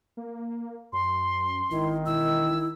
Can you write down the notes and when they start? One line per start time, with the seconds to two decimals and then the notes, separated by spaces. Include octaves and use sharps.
0.17 A#3
0.93 F#2 C6
1.71 G#1 D#3 E4
2.06 E1 E4 E6